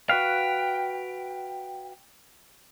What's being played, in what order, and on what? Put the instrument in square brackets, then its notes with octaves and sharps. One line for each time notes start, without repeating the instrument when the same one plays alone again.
[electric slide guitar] F#4 B4 F5 [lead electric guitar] G5